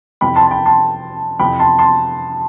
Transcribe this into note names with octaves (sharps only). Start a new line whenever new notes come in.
F2 C3 E3 G5 B5
A5 C6
A5
G5 B5
A5 C6
F2 C3 E3 G5 B5
A5 C6
A5 C6